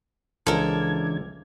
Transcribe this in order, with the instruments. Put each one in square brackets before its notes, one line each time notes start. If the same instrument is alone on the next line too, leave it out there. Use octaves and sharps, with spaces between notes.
[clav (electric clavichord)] C#2 F3 [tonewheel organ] E3 D4 G#6 [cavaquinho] A4 A#4